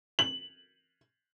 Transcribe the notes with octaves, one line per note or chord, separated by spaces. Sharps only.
F#7